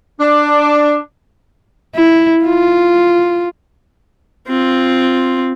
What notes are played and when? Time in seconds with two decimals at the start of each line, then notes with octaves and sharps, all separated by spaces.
0.19 D4
1.96 E4
2.46 F4
4.47 C4 F4